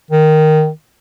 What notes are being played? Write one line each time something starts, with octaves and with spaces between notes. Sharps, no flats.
D#3